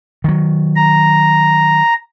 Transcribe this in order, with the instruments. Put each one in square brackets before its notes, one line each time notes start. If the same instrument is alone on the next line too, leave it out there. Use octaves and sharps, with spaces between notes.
[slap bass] D#3 F#3
[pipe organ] A#5